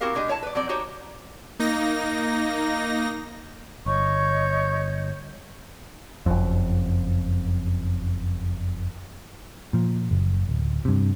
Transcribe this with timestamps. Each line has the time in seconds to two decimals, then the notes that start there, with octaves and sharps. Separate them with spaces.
0.01 C4 E4 F#4 G4 A#4 F5
0.14 B2 G#3 D4 G4 D#5
0.28 E4 C#5 G#5 A5
0.43 B4 D5
0.55 F#3 C4 D5
0.69 D4 D#4 F#4 G4 C#5
1.59 A#3 D#4 A#6
3.86 G1 C#5 D#5 C#6 G6
6.26 F#1 F2
9.73 A#2 F3
10.11 F#1
10.49 D1
10.85 G2 C3